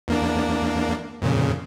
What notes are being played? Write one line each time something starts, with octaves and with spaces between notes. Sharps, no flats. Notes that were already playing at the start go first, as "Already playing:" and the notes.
E2 A#3 D4
F2 A#2 C#3